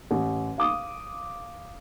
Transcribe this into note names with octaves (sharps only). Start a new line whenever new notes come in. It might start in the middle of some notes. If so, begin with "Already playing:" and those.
A1
F5 D6 D#6